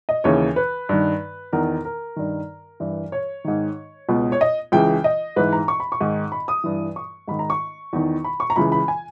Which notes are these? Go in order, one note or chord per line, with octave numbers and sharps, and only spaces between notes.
D#5
D#2 C#3 E3 C#5
B4
G2 D#3
E2 D#3 A#4
A#4
G2 D#3
G2 E3
C#5
G#2 D#3
C#2 B2
C#5
D#5
C#2 C#3 E3 G5
D#5
G#2 E3 B4
A#5
C#6
B5
C#6
G#2 D#3
B5
D#6
G2 E3
C#6
G#2 D#3 B5
A#5
C#6
E2 D#3
B5
C#6
A#5
C#2 C#3 E3 B5
B5
G#5